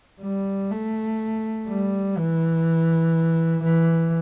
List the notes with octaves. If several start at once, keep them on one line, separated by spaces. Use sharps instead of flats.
G3
A3
G3
E3
E3